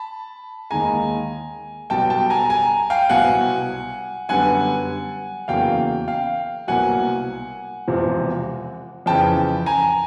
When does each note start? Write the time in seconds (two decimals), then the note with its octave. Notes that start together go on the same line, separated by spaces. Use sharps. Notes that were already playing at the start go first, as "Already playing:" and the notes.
Already playing: A5 B5
0.71 D#2 D#3 G#3 G#5 A#5
1.90 B1 B2 G3 G5 A5
2.10 G5 A5
2.30 G#5 A#5
2.50 G#5 A#5
2.90 F5 G5
3.10 C2 B2 F#3 F#5 G#5
4.29 F#2 D3 G3 B3 F#5 G#5
5.48 E2 C#3 F#3 A#3 F5 G5
6.08 F5 G5
6.67 C2 B2 F#3 A#3 F#5 G#5
7.88 E1 E2 C3 F3
9.06 F2 C#3 E3 G5 A5
9.66 G#5 A#5